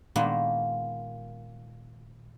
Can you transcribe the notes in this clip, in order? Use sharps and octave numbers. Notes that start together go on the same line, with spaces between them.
A#2 D#3 G#3 A#3 B3